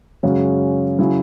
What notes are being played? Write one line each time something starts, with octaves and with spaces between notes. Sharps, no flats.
F#2 C#3 G#3 C#4 F#4
C#3 F#3 E4 G#4